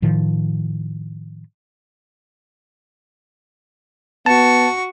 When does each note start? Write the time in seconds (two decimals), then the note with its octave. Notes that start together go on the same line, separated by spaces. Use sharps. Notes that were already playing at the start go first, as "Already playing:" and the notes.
0.02 A2 D#3 F3
4.26 B3 F#4 A5 C#6